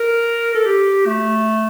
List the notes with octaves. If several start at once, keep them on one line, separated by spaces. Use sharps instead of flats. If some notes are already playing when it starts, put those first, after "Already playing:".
Already playing: A#4
A4
G4
A3